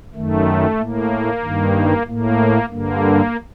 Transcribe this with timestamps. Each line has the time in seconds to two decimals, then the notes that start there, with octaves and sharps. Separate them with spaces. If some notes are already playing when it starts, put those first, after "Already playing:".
0.15 F#2 D#3 A3
0.78 A2 A#3
1.42 G2 D#3
2.07 A2 A#3
2.70 G2 D3 A#3